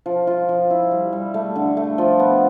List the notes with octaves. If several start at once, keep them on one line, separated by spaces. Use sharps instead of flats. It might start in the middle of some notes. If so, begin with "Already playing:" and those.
F3
F4
F3
E4
G3
G3
A3
D3
A3
F3
B3